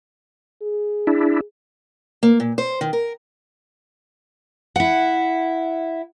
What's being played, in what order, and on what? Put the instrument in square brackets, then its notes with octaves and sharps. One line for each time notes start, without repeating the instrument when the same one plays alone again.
[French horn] G#4
[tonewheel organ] D4 E4
[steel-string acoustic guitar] A#3
A#2
C5
D#3
A#4
E4 F#5